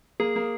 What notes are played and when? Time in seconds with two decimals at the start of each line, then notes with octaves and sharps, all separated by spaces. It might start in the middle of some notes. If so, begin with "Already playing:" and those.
0.20 A#3 G#4
0.36 A#3